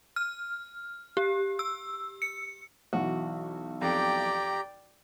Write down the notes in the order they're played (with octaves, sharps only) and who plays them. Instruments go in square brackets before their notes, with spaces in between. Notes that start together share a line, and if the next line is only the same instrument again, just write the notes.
[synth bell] F6
G4
E6
C#7
[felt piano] B1 E3 [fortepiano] F#4
[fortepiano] F2 [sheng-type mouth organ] G4 A#5 [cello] D5 G5